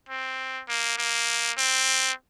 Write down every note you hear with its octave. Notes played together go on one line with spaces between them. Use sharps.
C4
A#3
A#3
C4